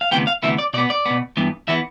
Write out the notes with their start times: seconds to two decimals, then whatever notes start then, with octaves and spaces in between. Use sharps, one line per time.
0.01 F5
0.11 D2 C3 E3 B3 G5
0.27 F5
0.43 D2 C3 E3 B3 E5
0.58 D5
0.73 B2 D5
0.78 B3
0.90 D5
1.06 B2 B3
1.37 G2 E3 B3
1.68 E3 B3 E5